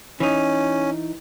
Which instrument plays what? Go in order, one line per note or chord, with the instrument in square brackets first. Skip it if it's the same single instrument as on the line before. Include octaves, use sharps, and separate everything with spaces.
[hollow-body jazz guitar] E3 D#4 [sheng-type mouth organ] C#4